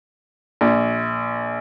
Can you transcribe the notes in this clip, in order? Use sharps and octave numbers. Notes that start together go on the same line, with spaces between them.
A#1